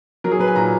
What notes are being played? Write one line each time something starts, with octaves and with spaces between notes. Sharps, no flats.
F#3 A#4
G#4
F#3 B4
G#5
A#2 A#5